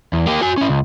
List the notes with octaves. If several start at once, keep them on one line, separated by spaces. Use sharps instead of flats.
E2
A#3 G4
F#4 G#5
C#4 E4
C#2